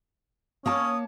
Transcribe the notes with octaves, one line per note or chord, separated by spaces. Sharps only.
A#3 C#4 C#5 A5 D#6